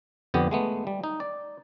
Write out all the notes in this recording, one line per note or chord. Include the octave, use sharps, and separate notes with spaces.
F2 D3 B3 G4
G#3 A3 B3
G3
D#4
D5